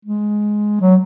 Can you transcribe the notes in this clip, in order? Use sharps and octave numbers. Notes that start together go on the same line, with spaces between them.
G#3
F#3